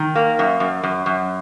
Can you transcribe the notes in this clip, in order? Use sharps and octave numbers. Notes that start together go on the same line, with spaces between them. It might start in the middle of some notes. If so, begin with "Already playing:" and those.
Already playing: D#3
A#3
F#2
F#2
F#2
F#2